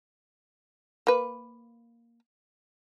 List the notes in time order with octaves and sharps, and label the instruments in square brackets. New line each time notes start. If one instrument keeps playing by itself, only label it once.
[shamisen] A#3 B4